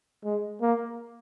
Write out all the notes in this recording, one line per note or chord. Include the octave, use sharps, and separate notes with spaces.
G#3
A#3